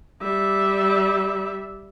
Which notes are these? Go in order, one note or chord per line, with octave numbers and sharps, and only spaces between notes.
G3 E5